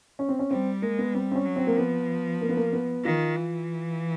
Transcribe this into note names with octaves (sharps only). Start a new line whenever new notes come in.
C#4
C4
C#4
G3 C4
G#3 A#3
B3
G3 C4
C4
C#4
F#3
C4
A#3
F3 B3
A#3
B3
A#3
B3
D#3 F4
E3